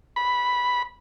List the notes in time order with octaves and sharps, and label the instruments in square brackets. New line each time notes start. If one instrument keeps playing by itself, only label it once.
[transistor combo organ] B5